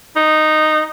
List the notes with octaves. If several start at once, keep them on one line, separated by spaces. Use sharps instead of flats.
D#4